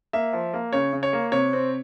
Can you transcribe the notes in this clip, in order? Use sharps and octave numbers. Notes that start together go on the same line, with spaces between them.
A#3 E5
F3
A#3
C#3 C#5
C#3
C#5
A#3
C3 C#5
C4